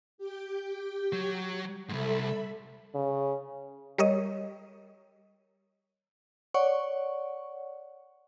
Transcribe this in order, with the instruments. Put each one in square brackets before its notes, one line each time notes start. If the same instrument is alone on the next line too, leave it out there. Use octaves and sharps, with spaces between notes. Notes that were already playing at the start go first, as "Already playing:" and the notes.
[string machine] G4 G5
[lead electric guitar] F#3
[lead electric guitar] C2 G#2 [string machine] A4 E5 B5
[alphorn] C#3
[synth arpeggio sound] G3 A#4 C#5 D#5
[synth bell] C#5 D5 F#5 C#6